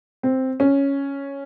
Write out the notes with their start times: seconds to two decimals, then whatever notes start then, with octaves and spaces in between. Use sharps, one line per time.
0.23 C4
0.60 C#4